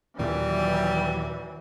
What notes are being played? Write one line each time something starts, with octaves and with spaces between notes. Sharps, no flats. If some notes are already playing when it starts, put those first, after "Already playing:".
D#2 A#2 E3 F#3 G3